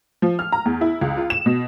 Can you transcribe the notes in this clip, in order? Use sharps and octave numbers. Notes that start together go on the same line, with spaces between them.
F3
F6
A#5
E2
E4
C#2
F4
E7
B2